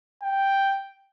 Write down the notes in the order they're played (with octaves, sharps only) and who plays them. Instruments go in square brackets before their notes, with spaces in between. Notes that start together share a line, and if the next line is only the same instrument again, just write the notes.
[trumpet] G5